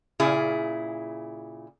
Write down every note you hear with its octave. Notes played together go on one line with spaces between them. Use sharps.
A#2 C#3 E4 G#4